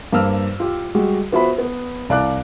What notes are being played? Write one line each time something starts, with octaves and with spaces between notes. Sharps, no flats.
G2 A#3 C5 F5 E6 F6
F4 G4
G3 G#3 F#4
B3 F4 F#4 C5 E5 B5
B3
C2 D5 F5 D6 F#6